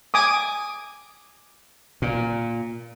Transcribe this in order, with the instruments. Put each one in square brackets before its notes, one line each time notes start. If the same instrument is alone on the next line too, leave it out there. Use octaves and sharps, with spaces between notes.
[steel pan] G#5 D6 D#6
[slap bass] A#2